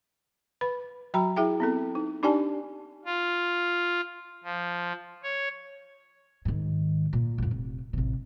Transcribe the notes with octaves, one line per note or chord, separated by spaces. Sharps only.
B4 B5
F#3 F#4 G5 A#5 B5
E4 G#4 E5 G5
B3 C4 A4
D#4
D4 D#4 G4 D5 G#5 A5
F4
F3
C#5
G#2 D#3
A#2
A1 F2
F1
A1 C3